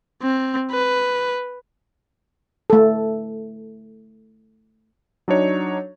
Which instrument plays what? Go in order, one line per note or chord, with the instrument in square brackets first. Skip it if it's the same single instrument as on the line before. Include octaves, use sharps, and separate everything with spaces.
[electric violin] C4
B4
[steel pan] A3 A4
[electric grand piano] F#3 D4 D#4 C#5